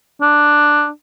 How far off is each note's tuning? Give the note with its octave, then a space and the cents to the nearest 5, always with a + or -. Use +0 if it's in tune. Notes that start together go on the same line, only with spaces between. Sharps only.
D4 +5